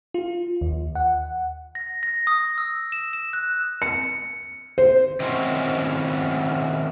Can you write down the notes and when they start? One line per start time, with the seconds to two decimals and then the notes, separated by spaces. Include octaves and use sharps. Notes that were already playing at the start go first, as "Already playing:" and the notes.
0.14 F4
0.61 D#2
0.95 F#5
1.75 A#6
2.03 A#6
2.27 D#6
2.58 E6
2.92 E7
3.13 E7
3.33 F#6
3.82 C#7
4.78 C5
5.20 D#3 C4 C#4 E4 F#4 C5